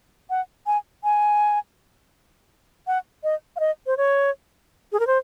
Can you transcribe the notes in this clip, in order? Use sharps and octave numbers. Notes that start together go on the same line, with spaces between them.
F#5
G#5
G#5
F#5
D#5
F5
D#5
C5
C#5
G#4
A#4
C5